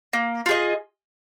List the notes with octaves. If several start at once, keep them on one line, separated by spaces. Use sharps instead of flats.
A#3
F4 G#4 D#5